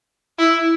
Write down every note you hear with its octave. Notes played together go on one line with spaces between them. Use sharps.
E4